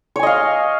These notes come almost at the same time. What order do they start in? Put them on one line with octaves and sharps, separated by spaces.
C#5 G#5 D#5 F5